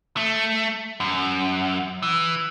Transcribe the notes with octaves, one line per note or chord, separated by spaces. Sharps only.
A3
F#2
E3